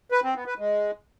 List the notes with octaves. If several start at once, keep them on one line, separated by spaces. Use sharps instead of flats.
B4
C4
B3
B4
G#3